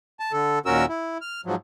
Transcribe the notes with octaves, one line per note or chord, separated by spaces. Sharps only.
A5
D3 A4
D#2 A#2 C#4 F#4 A#4 E6
E4
F6
G#2 F3 F#3